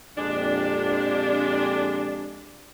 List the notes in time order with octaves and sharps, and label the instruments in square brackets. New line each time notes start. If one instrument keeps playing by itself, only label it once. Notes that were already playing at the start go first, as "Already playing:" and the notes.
[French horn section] F2 A#2 G4 [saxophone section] G#3 D4